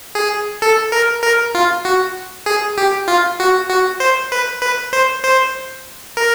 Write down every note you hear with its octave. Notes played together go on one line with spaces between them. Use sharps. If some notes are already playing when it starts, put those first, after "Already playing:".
G#4
A4
A#4
A#4
F4
F#4
G#4
G4
F4
F#4
F#4
C5
B4
B4
C5
C5
A#4